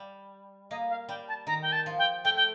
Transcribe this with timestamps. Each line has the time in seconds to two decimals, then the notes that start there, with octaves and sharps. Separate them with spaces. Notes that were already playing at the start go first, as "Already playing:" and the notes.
Already playing: G3
0.70 A#3 D#5
0.90 F5
1.08 G3 G5
1.28 A5
1.47 D#3 A#5
1.62 G5
1.72 A5
1.86 F3
1.98 G5
2.24 A3 G5
2.36 G5